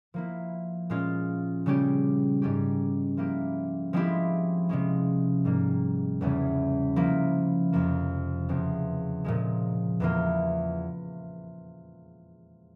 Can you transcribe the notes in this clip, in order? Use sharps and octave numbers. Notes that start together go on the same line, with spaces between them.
F3 A#3 E4
A#2 G#3 C#4 F4
C#3 G3 C#4 G4
G#2 G3 C#4 G4
F3 A#3 E4 G4
F3 G#3 C4 E4 G4
C3 F3 G#3 C#4
G#2 G3 A#3
E2 C#3 E3 G3 C#4
F3 A#3 E4
F2 C3 F3 A#3
E2 C#3 F3 C4
A#2 F3 G#3
E2 E3 A#3 F4